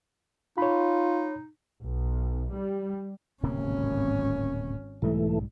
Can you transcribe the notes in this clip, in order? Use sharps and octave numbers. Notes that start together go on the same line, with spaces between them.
D#4 F4 C#5 B5
B1
G3
D1 G#1 C3 A#3 C#4
B1 G#2 E3 G3 A3